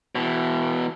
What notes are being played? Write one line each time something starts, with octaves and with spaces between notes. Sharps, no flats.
B2 E3